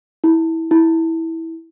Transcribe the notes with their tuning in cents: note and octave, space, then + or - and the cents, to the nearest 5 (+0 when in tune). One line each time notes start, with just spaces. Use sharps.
E4 -20
E4 -15